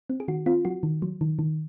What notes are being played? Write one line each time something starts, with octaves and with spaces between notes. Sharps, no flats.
C4
G#4
D#3 F#4
C4 F4
F#3 F#4
D#3
F#3
D#3
D#3